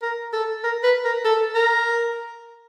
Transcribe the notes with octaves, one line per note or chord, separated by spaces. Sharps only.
A#4
A4
A#4
B4
A#4
A4
A#4